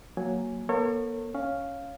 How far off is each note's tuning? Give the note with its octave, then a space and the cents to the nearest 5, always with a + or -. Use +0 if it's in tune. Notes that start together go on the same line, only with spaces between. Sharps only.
F#3 +0 A#3 +0 G#5 +0
A#3 +45 A4 +45 C#5 -20
C#4 +0 F5 +0